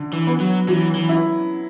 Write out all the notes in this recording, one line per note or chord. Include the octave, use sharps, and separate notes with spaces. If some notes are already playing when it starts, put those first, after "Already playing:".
Already playing: D3
E3
B3
F#3
E3 F#3
E3
E4